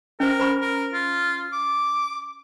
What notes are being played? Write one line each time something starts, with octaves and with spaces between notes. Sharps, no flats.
C#4 A#4 C5
C5 B5 C#6
A#4
F4
D6